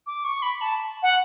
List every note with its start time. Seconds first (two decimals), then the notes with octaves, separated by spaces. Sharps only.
0.07 D6
0.24 C#6
0.42 B5
0.61 A5
1.03 F#5